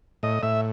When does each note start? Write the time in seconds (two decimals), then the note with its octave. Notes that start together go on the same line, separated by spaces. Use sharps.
0.23 A2 D#5
0.43 A2 E5